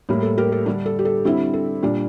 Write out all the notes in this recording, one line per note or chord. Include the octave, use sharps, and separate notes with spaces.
A2 G3 A#3
A4
G4 A#4
A4
D3 G3 D4
A4
G4
A4
D3 G3 C4 E4
A4
A#2 G3 D4